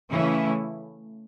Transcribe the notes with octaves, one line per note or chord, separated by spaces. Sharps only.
C#3 E3 A3 C#4 E4